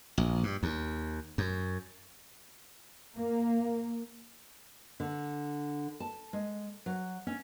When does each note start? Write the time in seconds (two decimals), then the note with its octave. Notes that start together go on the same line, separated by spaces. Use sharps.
0.18 A#1
0.43 G2
0.63 D#2
1.38 F#2
3.17 A#3
5.00 D3
6.00 A5
6.33 G#3
6.86 F#3
7.27 C#4